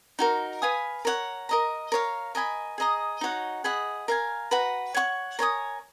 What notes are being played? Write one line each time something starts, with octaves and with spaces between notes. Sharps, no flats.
D#4 F#4 A#4
B4 F5 G#5 D#6
A#4 C#5 F#5
A#4 D#5 A#5
A#4 C#5 F5
A#4 D#5 G#5 B5
G#4 D#5 A#5 D#6
D#4 F#4 C#5 F#5
G#4 D#5 F#5 B5
A#4 F5 G#5
F#4 B4 F#5 A#5
C#5 F#5 C#6
A#4 C#5 G#5 D#6